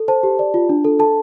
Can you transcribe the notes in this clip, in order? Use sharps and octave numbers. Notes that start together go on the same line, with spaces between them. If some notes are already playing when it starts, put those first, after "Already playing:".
Already playing: A4
C5 A5
G4
D5
F4
D4
A4
A4 A5